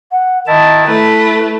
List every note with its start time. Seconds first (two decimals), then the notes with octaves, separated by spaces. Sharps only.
0.11 F#5
0.47 D#3 E4 D#5 A5
0.87 A3 E4 B4